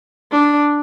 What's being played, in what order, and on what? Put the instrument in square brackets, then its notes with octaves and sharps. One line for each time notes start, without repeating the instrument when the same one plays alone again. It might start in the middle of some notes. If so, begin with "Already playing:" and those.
[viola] D4